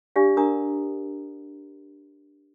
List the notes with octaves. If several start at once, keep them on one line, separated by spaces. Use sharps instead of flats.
D4 G4 D5 F5
D4 A#4 A#5 D#6